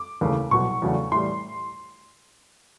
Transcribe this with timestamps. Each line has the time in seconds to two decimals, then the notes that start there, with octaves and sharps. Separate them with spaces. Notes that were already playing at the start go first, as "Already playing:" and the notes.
Already playing: D6
0.21 D#2 C#3 E3 A3
0.51 C2 B2 F#3 C#6
0.82 E2 C#3 F#3 A3 D4
1.12 A2 E3 G3 C6